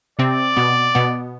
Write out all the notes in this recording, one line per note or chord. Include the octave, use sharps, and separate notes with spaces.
C3 C4 D5
B2 B3
B2 B3